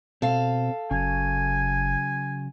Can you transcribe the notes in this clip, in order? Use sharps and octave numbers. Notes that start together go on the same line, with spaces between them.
B2 C4 A4 F5
F#1 C#3 F#3 G#5